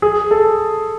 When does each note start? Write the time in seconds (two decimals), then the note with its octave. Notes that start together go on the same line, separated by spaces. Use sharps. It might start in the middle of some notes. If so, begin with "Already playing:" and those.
0.02 G#4
0.31 A4